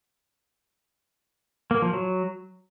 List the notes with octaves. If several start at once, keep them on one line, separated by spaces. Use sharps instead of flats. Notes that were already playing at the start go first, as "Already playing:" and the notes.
A#3
F3
F#3